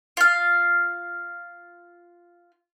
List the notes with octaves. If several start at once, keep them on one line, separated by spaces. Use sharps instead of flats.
F4 F5